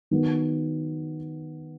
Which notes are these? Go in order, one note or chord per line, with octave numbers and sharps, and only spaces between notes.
D#3 F#3 B3